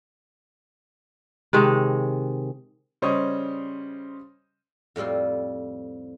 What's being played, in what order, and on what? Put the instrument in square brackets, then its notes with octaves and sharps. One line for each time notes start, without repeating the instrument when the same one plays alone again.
[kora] C3 D#3 G#3
[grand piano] C#3 G3 C5 C#5 D#5 D#6
[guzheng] F2 A2 G3 C4 F4